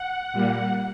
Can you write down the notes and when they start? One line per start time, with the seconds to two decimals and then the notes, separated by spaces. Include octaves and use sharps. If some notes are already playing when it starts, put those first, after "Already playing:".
Already playing: F#5
0.33 A#2 G3 A#3